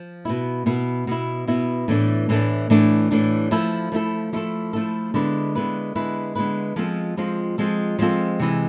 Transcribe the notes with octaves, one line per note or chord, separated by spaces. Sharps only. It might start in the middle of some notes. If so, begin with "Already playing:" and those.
Already playing: F3
B2 B3 E4
B2 B3 E4
B2 B3 E4
B2 B3 E4
A2 E3 A3 D4
A2 E3 A3 D4
A2 E3 A3 D4
A2 E3 A3 D4
F3 A3 E4 A4
F3 A3 E4 A4
F3 A3 E4 A4
F3 A3 E4 A4
D3 G#3 B3 E4 B4
D3 G#3 B3 E4 B4
D3 G#3 B3 E4 B4
D3 G#3 B3 E4 B4
F3 G#3 C4 F4 A4
F3 G#3 C4 F4 A4
F3 G#3 C4 F4 A4
F3 G#3 C4 F4 A4
C3 E3 G#3